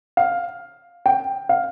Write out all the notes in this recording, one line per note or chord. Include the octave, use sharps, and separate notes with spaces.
F5
G5
F5